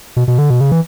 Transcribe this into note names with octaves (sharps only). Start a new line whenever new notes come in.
B2
B2
D3
B2
C#3
E3